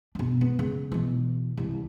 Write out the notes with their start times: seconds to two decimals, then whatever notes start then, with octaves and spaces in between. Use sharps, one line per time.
0.15 B2 D4
0.41 B3
0.59 C#3
0.92 B2 E3
1.57 C2 E3